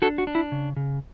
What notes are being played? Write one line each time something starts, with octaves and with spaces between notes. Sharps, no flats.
D4 F#4 A4
F#4
D4
E4
C#3
C#3